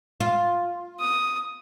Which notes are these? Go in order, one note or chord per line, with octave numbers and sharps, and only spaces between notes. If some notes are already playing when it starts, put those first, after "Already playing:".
F4
D#6